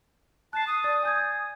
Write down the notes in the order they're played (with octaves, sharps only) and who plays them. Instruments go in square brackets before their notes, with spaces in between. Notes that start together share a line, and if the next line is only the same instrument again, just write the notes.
[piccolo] A5 [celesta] F#6 C7
[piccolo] D#6
[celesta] D5 A6
G#5 G6 G#6